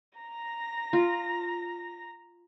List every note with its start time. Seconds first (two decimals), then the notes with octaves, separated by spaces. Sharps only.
0.19 A#5 A#6
0.93 F4